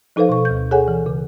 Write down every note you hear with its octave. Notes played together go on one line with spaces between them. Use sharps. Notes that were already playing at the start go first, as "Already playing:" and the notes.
F3 D#4 A4 B4 C5 F5
B2 C#6
D2 G6
G#4 A4 C#5 F#5 G#5
E3
C#3